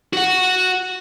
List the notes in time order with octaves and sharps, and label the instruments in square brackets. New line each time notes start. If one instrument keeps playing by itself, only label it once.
[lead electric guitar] F#4 F#5